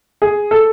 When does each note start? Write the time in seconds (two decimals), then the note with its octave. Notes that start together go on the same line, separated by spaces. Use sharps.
0.22 G#4
0.51 A4